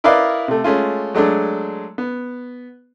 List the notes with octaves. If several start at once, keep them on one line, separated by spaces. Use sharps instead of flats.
E4 A#4 B4 D5 D#5 F5
C3 A3
G#3 A3 C#4 F4
F#3 G#3 A3 D4
B3